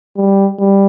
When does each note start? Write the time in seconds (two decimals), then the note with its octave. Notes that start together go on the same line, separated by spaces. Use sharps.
0.16 G3
0.59 G3